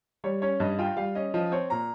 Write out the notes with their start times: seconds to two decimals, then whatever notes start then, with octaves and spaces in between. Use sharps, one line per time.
0.24 G3 C#5
0.42 C#4 C#5
0.60 G2 D#5
0.79 F4 G5
0.97 G3 F5
1.15 C#4 D#5
1.34 F3 D#5
1.52 C4 C#5
1.70 A#2 A#5